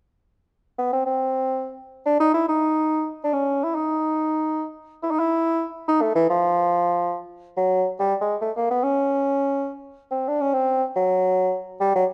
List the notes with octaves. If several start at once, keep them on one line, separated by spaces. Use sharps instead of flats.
B3
C4
C4
D4
D#4
E4
D#4
D4
C#4
E4
D#4
E4
D#4
E4
D#4
A3
E3
F3
F#3
G3
G#3
A3
A#3
B3
C#4
C4
D4
C#4
C4
F#3
G3
F#3